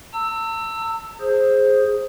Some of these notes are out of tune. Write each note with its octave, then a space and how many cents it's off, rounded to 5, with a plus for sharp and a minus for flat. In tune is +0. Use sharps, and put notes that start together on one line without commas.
A5 +45 E6 +0
G#4 +0 C5 +10